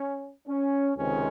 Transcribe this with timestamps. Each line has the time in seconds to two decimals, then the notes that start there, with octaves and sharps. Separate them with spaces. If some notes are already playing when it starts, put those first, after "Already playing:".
Already playing: C#4
0.48 C#4
0.96 C#2 C3 D#3 G#3 C4 C#4